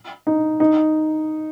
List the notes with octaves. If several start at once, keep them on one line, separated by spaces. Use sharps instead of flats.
D#4
D#4